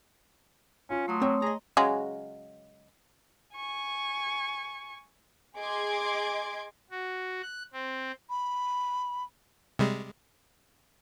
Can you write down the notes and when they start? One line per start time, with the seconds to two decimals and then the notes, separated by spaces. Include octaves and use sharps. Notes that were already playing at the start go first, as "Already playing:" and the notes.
0.90 C#4 F4
1.08 F#3 A3 C6 D#6
1.22 C4 C#5
1.42 G#4 D#5 A#5
1.77 C#3 F#3 G#3
3.55 G#5 C#6
5.57 G#4 D#5 C6 D6 G#6
6.91 F#4
7.42 F#6
7.73 C4
8.30 B5
9.79 C3 G3 G#3